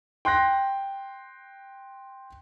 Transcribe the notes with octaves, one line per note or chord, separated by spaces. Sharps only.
G5 C6 F#6 A#6